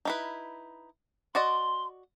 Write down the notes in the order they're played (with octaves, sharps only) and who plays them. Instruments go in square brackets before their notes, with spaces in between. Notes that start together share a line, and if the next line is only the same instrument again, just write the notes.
[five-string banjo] D#4 E4 B4
[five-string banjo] F#4 D5 D#5 [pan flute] C6